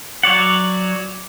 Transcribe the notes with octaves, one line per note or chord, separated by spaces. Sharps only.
F#3 C#5 D5 F#5